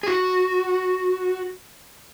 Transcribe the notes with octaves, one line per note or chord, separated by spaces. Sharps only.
G#4
F#4